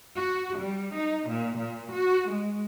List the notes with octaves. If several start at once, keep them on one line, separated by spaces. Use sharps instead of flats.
F#4
G3
D#4
A#2
A#2
F#4
G#3